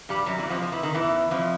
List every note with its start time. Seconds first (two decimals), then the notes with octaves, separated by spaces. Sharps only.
0.09 G2 G3
0.26 F#2 F#3
0.38 E2 E3
0.49 F2 F3
0.62 F3
0.72 E3
0.83 D#3
0.94 E2 E3
1.31 F2 F3